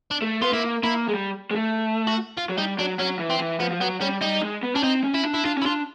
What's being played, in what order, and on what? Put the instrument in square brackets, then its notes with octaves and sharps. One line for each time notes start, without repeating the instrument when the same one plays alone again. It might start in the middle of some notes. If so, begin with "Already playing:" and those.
[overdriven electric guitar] D4
[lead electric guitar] A3
[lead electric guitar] B3 [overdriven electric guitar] F4
[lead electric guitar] A#3 [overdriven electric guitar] E4
[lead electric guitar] A#3 [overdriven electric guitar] E4
[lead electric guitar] G#3
G3
G#3
A3
[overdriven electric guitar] F#4
F4
[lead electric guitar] F#3
[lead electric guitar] G3 [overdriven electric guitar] D#4
[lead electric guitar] F#3 [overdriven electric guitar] D4
[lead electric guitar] F#3 [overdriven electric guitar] C#4
[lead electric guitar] E3
[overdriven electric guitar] C4
[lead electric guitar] E3
[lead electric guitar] F3 [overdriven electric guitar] B3
[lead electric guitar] F3
[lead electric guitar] F#3 [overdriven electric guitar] B3
[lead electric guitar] G3 [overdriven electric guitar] C#4
[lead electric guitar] G3 [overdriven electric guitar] D#4
[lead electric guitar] G#3
B3
[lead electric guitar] C#4 [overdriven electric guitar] D4
[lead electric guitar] C4 [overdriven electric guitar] D#4
[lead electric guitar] C#4
[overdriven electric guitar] E4
[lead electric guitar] D4
[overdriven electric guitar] E4
[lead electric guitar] D4 [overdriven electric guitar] F4
[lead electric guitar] C#4
[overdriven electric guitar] E4
[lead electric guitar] D4 [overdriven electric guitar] F4